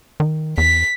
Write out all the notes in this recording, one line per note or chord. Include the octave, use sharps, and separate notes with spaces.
D#3
E2 B6